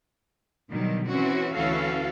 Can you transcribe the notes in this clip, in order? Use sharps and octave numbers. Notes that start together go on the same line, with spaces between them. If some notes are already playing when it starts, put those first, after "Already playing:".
B2 D3 D#3 F#3 G3
E3 C4 C#4 F#4
D2 E3 C#4 F#4 A4 F5